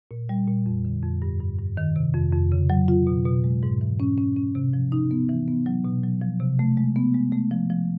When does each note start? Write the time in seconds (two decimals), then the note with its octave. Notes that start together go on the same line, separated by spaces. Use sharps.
0.11 A#2
0.29 G3
0.48 A#2
0.66 F2
0.85 D3
1.03 F2
1.22 G2
1.40 G2
1.59 G2
1.77 D#3
1.96 C3
2.14 F2
2.33 F2
2.52 C#3
2.70 F#3
2.88 F4
3.07 B2
3.25 B2
3.44 G#3
3.63 G#2
3.81 E3
4.00 C#4
4.18 C#4
4.37 C#4
4.55 C3
4.73 F3
4.92 D#4
5.11 B3
5.29 E3
5.48 B3
5.66 F#3
5.85 B2
6.04 F#3
6.21 F3
6.40 C3
6.59 A3
6.77 G#3
6.96 B3
7.14 G#3
7.32 A3
7.51 F3
7.70 F3